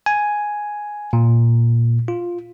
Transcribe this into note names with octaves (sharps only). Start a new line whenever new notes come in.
G#5
A#2
F4